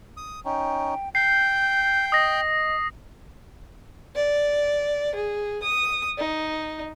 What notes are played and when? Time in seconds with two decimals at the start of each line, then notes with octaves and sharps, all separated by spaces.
0.17 D#6
0.45 C#4 D#4 G5
1.15 G5 G6 C7
2.12 D#5 D#6 A#6
4.15 D5
5.15 G#4
5.62 D#6
6.18 D#4